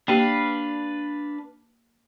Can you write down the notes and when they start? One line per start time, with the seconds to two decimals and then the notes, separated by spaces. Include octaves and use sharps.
0.08 A#3 D4 G4 B4 F5